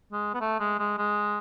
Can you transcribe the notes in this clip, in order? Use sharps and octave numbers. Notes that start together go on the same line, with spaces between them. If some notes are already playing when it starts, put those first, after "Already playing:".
G#3
B3
A3
G#3
G#3
G#3